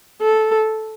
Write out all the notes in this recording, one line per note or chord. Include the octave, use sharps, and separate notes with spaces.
A4